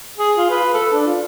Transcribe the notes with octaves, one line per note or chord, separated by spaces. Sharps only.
G#4
F4
B4
A4
D4
F4